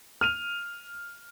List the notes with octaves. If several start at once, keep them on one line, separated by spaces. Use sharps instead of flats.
F6 D#7 F7